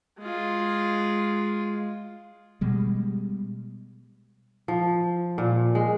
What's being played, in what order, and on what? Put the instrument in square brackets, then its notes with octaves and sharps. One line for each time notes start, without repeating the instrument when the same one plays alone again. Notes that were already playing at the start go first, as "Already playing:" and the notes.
[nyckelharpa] G#3 F4
[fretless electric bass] B2 G3 G#3
[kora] F3
A#2
G#3